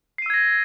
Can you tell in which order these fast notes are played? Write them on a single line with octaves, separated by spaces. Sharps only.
C7 D#7 E6 G#6 A#6